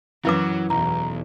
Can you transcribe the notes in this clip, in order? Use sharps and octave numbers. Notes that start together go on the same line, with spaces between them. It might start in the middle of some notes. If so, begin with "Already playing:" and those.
F#2 E3 F#3 E4 B4 D6
B1 E2 A#5